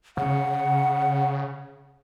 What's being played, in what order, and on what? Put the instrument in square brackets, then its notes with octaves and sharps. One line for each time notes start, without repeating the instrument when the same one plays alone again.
[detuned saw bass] C#3 [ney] F#5